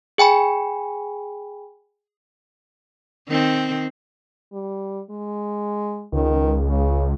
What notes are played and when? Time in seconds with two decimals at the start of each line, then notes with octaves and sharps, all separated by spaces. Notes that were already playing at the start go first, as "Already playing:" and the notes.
0.18 G#4 G5 G#5 B5
3.29 D#3 C4
4.53 G3
5.10 G#3
6.13 C#2 D#3
6.69 C#3